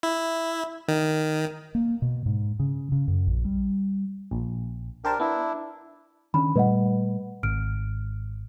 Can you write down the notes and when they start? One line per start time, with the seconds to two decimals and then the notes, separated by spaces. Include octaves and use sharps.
0.03 E4
0.88 D#3
1.75 A#3
2.02 B2
2.26 G#2
2.59 C#3
2.92 C#3
3.08 F#2
3.27 A#1
3.45 G3
4.31 A#1
5.05 D4 G4 A#4 C5 A5
5.20 B3 D4 E4
6.34 D#3 C#4 D4 B5
6.56 A#2 G3 A3 B4 D#5 F#5
7.43 G#1 F6 D7